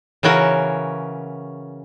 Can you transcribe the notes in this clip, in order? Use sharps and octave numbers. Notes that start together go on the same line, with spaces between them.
C#3 E3 C#4 F#4 A#4